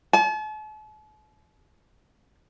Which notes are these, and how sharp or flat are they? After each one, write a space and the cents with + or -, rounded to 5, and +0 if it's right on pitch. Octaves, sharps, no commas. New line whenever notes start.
A5 -45